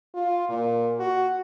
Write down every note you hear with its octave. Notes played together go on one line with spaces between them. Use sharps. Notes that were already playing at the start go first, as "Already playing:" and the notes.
F4
A#2
F#4